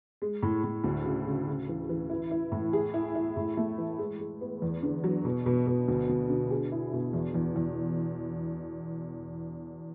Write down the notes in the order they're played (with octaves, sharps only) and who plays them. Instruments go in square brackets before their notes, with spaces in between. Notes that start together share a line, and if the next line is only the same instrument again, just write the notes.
[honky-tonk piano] G#3
A2
A2
D2
C#3
C#3
C#3
E3
E3
E4
E4
A2
G#4
E4
E4
A2
A3
E3
G#3
G#3
B3
E2
D3
F#3
B2
B2
B2
D2
D2
D3
G#4
E4
B2
E2
E2
E2